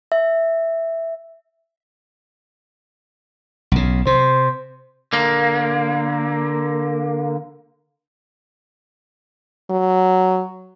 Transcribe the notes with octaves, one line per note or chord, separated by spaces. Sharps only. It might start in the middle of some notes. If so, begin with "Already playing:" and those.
E5
B1 C#3
C3 C5
D3 A#3
F#3